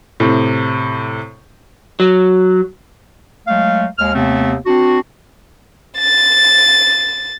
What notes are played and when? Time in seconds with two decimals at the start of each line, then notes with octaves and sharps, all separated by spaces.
0.20 A2 C3
2.00 F#3
3.48 F#3 G#3 A3 F5
3.99 D#2 G#3 F6
4.15 D#2 C3 A3 B3 C4
4.66 C4 D4 F#4
5.98 A6